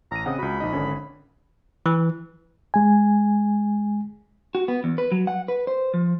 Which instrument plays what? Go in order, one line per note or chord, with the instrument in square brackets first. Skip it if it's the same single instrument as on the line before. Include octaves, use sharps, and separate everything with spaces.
[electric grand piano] A1 D#7 [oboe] A#5
[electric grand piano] C#3 C4 F#5 [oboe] D#5
[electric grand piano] C#2 F#4 [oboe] B5
[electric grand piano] A#1 D#4 D#5
G#1 D3 C#4
[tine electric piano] E3
[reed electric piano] G#3 G#5
[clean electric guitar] F#4
B3
E2
B4
F#3
F#5
B4
C5
F3